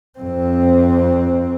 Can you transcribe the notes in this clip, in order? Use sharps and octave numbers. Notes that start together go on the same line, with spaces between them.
F2 C4